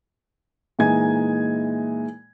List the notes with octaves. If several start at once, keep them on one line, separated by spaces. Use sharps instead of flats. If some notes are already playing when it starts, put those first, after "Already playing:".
A#2 E3 G#3 D#4 G#5 G#6